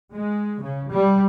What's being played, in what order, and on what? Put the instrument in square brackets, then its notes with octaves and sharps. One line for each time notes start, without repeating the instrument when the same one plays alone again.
[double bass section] G#3
C#3
G3